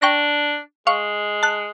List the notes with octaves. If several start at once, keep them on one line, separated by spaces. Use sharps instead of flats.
D4 G5 C#6 A#6
G#3 F5 C#6
A5 F#6